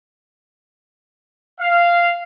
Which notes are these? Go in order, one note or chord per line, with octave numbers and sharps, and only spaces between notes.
F5